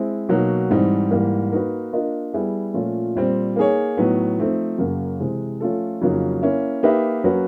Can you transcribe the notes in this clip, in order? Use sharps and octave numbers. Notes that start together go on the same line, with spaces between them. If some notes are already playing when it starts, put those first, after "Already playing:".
Already playing: G#3 C4 E4
B2 F#3 A#3 D#4 F#4
G#2 E3 G3 C4 D#4
G#2 E3 G3 A#3
A#3 D#4 F#4 B4
A#3 D4 F4 A#4 D#5
G3 B3 E4 G#4
A#2 F3 A3 C#4 F4
A#2 G3 C4
A#3 D#4 G#4 C#5
A2 F#3 B3 D#4
F3 A3 C4 D#4
F#2 C#3 F#3 A#3
C3 E3 G#3 C4
F3 A3 C#4 F4 A4
F2 C#3 F#3 A#3 D#4
A#3 C#4 E4
A#3 D#4 G4 B4 E5
F#3 A#3 C#4 F#4 B4